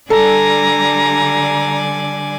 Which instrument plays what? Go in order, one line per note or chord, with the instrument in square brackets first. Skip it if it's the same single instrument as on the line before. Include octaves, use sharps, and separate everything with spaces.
[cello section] D3 G3 [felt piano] A4 [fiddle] D5 G#5 [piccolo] A#5